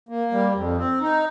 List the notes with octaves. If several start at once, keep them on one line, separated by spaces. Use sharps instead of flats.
A#3
G3
F2
C4
D#4